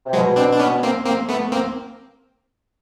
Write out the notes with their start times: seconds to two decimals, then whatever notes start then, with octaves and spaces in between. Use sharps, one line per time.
0.04 C3
0.13 B2 F#3 G#3
0.36 C4 D4
0.52 D4
0.59 B3 C#4
0.83 A#3 C4
1.06 A#3 C4
1.29 A3 B3
1.52 A#3 C4